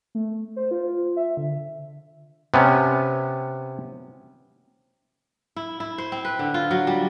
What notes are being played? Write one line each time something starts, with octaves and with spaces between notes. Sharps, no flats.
A3
C5
F4
E5
D3
C3 B3 C#4
E4
E4
C5
C4
B4
D3
F4
F#3
G3